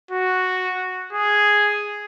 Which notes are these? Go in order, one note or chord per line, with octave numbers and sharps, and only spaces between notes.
F#4
G#4